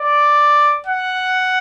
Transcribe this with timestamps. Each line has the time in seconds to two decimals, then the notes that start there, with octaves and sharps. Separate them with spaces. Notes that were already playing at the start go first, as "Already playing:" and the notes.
Already playing: D5
0.86 F#5